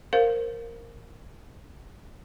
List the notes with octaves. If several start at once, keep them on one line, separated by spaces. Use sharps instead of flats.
A#4 C5 F5